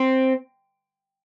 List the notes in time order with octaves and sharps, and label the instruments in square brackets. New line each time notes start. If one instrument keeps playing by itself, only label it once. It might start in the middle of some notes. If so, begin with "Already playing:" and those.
Already playing: [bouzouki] C4